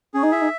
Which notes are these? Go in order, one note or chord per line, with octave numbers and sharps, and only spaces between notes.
C#4 G#4
D#4
E4 E5
D#4